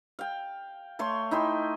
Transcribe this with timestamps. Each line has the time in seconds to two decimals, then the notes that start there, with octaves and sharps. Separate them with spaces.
0.19 F5 G5
0.99 A3 C#5 C6
1.31 D#4 E4 G5 C6